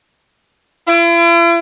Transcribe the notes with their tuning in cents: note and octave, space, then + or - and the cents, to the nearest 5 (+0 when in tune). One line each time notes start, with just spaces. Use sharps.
E4 +45